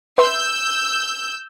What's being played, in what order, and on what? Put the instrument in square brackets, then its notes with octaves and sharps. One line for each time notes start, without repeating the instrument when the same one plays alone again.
[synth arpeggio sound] B4 E5 C6 [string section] E6 G6